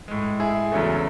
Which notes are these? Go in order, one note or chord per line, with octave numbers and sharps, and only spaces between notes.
A2 G#3
E4 G#4
E2 C#3 F#3 A3